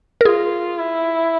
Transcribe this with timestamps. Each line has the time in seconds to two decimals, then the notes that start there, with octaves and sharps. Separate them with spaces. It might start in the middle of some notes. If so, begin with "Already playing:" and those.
0.21 A#4
0.25 F4 G#4
0.78 E4